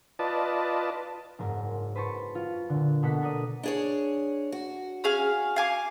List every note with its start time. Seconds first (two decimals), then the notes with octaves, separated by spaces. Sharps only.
0.19 F4 B4 D5 D#5 A5
1.39 F#1 G#2 A#4
1.95 B4 C5 A5 C#6
2.35 F4
2.69 A#2 D3
3.03 B2 A#3 A4 F#5 A5 B6
3.21 A4 A#4 D5 D#6
3.63 D4 G#4 C#5
4.52 F#4
5.04 C#4 G#4 F5
5.56 F5 G#5 D6